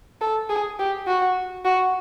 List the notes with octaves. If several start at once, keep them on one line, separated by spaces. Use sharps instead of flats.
A4
G#4
G4
F#4
F#4